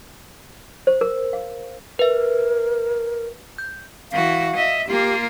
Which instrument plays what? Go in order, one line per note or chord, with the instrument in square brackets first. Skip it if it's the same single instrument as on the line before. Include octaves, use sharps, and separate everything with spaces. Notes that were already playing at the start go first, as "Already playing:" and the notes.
[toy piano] C5
A#4
F5
[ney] A#4 [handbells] B4 E5
[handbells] G6
[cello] E3 F#4 [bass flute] F5
[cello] D#5 E5
[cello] A#3 F4 [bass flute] G4